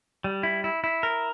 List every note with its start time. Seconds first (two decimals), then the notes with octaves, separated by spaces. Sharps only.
0.24 G3
0.43 E4
0.64 E4
0.84 E4
1.03 A#4